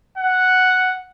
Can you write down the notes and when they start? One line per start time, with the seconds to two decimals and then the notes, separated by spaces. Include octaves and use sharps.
0.18 F#5